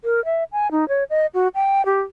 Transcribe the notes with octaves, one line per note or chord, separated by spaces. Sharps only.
A#4
E5
G#5
D#4
C#5
D#5
F#4
G5
G4